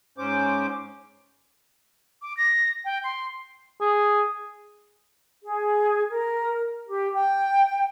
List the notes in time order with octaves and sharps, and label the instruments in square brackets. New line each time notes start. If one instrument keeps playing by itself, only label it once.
[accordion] G#2 C#4 C5 D6
[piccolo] D6
A#6
G5
C6
[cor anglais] G#4
[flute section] G#4
A#4
G4
G5